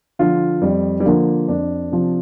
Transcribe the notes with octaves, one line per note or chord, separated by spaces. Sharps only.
D3 F3 F4
F2 G3
G3
D3 F3 A#3
F2 D4
C3 F3